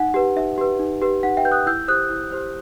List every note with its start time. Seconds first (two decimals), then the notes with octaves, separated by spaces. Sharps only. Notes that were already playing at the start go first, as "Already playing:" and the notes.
Already playing: D#4 F#5
0.14 G4 B4
0.36 D#4 E5
0.58 G4 B4
0.79 D#4
1.02 G4 B4
1.23 D#4 F#5
1.37 E5 G5
1.45 G4 B4 G6
1.52 D#6 F#6
1.66 E4 E6 G6
1.88 G4 C5 D#6 F#6
2.10 E4
2.32 G4 C5